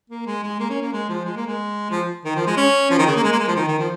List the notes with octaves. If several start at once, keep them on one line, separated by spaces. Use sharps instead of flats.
A#3
G#3
G#3
A#3
C#4
A#3
G#3
F3
G#3
A#3
G#3
F3
D#3
F3
G#3
C#4
F3
D#3
C#3
A#3
G#3
A#3
G#3
F3
D#3
D#3
F3